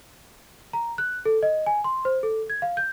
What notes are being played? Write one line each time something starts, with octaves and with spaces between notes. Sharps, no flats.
A#5
F#6
A4
D#5
G#5
C6
C5
A4
G#6
F5
G6